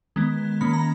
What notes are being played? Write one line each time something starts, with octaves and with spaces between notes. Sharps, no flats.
D#3 G#3 B3
D#3 A#3 C#4 B5
A#5